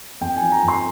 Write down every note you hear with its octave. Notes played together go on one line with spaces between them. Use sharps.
F2 G5
G#5
F3
A#5
F2
C6